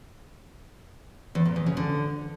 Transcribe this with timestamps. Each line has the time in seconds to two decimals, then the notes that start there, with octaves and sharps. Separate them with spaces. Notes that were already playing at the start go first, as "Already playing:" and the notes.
1.35 E2
1.46 A#2
1.56 E2
1.66 C#3
1.77 D3